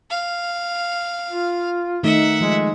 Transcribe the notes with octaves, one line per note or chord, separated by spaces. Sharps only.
F5
F4
D#3 A3 D#4 E5 F#5
F3 G#3